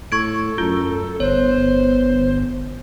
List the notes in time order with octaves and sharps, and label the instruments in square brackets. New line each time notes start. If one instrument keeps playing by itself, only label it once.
[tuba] A2 [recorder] A4 [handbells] C#6 G#6 D7
[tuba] F#2 [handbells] F4
[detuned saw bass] G1 [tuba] B3 [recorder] C5 [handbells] C#5